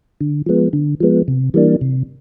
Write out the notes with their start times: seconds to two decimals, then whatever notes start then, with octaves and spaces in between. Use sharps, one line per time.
0.21 D3
0.46 F3 G#3 B3
0.73 D3
1.00 F3 G#3 B3
1.28 C3
1.54 E3 G3 A#3 D4
1.81 C3